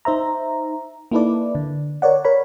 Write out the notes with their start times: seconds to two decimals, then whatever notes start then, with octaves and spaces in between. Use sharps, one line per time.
0.05 D#4 C5 E5 A#5
1.12 A#3 D#4 E4 A4 B4 D5
1.55 D3
2.02 A#4 C#5 D5 F#5
2.25 A#4 C#5 B5